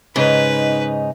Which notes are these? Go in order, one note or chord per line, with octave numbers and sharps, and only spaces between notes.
G#2 C#3 D#4 B4